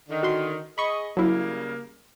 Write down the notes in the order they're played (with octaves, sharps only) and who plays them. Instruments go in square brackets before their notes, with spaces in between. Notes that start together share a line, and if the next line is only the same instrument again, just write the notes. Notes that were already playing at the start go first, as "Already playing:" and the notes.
[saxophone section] D3 D#3
[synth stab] F#4 C6
[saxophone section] G#4 D#5 [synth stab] B5 C#6
[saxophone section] C#3 G3 A#3 [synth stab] F#3 E4